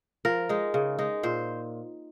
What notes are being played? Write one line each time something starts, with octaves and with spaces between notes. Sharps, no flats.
F3 A#4
G#3 D#4
C#3
G#3 D#4
A#2 C5